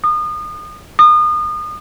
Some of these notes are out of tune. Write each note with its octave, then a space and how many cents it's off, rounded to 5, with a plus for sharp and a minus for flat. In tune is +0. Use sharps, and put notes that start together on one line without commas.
D#6 -35
D#6 -35